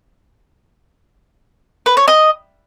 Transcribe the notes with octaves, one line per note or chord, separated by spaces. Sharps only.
B4
C#5
D#5